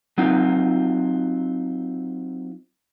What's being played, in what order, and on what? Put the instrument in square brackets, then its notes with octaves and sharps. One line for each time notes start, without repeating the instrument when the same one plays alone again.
[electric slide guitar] F#3 C4 D#4 F4